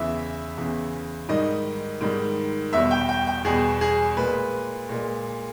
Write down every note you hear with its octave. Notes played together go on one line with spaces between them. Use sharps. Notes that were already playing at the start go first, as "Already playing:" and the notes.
Already playing: E2 C#3 E3 E5
E2 C#3 E3
G#2 D#3 G3 D#5
G#2 D#3 G3
E2 B2 G3 E5
G5
G5
G5
E2 B2 G3 G#4
G#4
A#2 G#3 B4
A#2 G#3